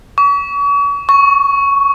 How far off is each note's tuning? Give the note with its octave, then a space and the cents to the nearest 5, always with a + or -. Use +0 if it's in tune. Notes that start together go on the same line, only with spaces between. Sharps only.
C#6 +40
C#6 +5